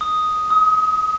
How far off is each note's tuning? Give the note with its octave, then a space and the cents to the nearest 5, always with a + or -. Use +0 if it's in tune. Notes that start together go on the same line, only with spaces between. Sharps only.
D#6 +5
D#6 +30